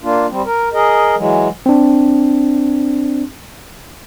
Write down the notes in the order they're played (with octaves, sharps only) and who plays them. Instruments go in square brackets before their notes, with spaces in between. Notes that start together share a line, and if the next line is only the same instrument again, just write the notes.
[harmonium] A#3 D4 F4
G3 C4
A#4
G#4 A#4 D#5
E3 F#3 G#3
[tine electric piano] C4 D4